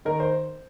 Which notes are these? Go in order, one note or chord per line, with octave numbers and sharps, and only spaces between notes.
D#3 A#4
C5